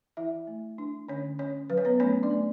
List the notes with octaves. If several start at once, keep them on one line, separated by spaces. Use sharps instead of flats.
E3 E4 E5
A3
D4
D3 C#4 C#5
C#4 C#5
F#3 B4
C#5
B3 B4
A3 C#4 C#5
D4 D5
A3